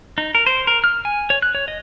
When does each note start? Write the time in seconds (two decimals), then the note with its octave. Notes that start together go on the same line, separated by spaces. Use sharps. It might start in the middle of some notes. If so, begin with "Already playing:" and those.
0.18 D#4
0.35 A#4
0.46 C5
0.67 A#4
0.84 F6
1.05 G#5
1.30 C#5
1.42 F#6
1.55 C#5
1.68 D#5